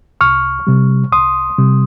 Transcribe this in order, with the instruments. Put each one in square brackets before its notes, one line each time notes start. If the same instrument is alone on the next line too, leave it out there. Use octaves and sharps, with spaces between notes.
[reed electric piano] C2 C#6 F6
C3 G3
C2 C6 D#6
C3 G3